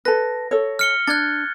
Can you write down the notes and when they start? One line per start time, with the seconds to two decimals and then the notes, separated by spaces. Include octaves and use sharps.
0.05 A4 B4 A#6
0.51 A4 C#5
0.79 F6 C#7 G7
1.07 D4 F#6 G#6 A6